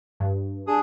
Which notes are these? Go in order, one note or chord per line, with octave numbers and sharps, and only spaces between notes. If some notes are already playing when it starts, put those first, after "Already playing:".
G2
D4 G#4 D#6